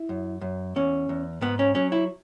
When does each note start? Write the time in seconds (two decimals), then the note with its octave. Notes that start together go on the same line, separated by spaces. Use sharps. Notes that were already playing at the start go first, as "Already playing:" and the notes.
Already playing: E4
0.09 F#2
0.41 F#2
0.76 E2 C#4
1.09 E2
1.41 G#2 B3
1.59 C#4
1.75 F#3 C#4
1.92 E4